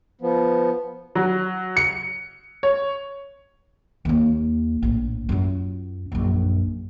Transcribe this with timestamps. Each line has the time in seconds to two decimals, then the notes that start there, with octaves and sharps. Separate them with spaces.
0.21 F3 B3
1.15 F#3
1.77 C#7
2.63 C#5
4.05 D#2 A#3
4.82 A#1 A2
5.29 F#2 F4
6.12 A#1 F#2